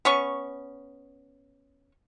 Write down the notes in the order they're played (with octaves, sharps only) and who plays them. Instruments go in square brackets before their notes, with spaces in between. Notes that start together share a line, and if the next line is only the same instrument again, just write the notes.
[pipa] B3 C#4 C#6